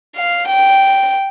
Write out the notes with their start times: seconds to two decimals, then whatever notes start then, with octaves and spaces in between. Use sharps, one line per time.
0.16 F5
0.48 G5